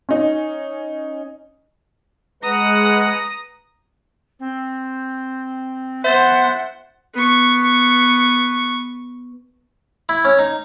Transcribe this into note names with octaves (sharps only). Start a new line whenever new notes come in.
C#4 D#4
G#3 B4 F#5 A#5 D#6
C4
B3 C5 E5 F#5 A6
B3 C#6
E4
C#4
D#4